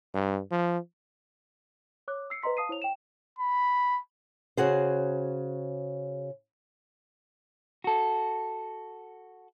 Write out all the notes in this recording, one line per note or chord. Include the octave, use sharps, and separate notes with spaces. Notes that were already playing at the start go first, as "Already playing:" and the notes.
G2
F3
C#5 D6 F#6
E6 C7 C#7
B4 C5 D#5 A#5 C6 B6
F5 A5 D#6 C7 D#7
E4 C5 C#5 F7
G5 E7
B5
C#3 F#4 G#4 C5
F#4 A4